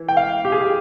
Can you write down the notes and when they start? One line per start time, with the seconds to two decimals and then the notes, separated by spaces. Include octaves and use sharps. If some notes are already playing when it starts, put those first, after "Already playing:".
Already playing: E3
0.08 G5
0.17 F5
0.45 G4
0.52 G#4
0.61 G4